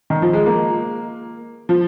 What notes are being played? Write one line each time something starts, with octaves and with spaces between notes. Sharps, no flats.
D#3
F3
G#3
A#3
F3